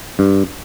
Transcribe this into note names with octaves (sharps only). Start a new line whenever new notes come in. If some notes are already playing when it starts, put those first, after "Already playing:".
G2